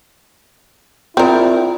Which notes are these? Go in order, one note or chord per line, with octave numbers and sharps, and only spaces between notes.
C4 E4 F4 A#4 D5 G5